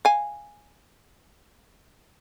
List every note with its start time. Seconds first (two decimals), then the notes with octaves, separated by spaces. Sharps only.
0.05 F5 G#5